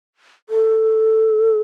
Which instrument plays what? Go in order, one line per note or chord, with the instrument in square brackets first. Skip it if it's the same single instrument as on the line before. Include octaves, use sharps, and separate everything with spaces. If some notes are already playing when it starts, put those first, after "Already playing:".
[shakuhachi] A4